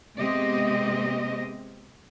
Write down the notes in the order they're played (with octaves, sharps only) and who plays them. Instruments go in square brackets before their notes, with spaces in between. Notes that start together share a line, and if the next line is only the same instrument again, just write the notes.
[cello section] C3 G#3 B3 C4 G4 D#5